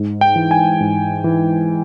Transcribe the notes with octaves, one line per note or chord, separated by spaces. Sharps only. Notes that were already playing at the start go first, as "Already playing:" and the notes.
Already playing: G#2
G5
E3
G#5
G#2
E3